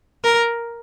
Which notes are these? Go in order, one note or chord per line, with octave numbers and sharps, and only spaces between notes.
A#4